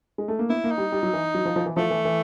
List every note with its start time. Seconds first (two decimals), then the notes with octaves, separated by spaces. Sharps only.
0.18 G#3
0.28 A3
0.39 A#3
0.49 B3 E4
0.64 A#3
0.71 D#4
0.78 G3
0.92 G3
1.03 F#3
1.13 E3
1.35 F#3
1.45 F3
1.56 F3
1.66 E3
1.77 F3 A3
1.91 E3
2.05 E3